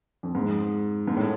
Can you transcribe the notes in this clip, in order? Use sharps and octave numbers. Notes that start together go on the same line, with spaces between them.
F2
G#2
G#2
A2